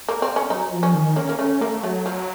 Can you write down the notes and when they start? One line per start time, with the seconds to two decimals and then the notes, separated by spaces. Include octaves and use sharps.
0.09 A#3
0.22 C4
0.36 C#4
0.50 F#3 D#4
0.72 F3
0.83 C#4
0.95 D#3
1.16 A#3 C#4
1.29 A#3
1.39 A3 C#4
1.61 A3 A#3
1.83 F#3 A3
2.06 F3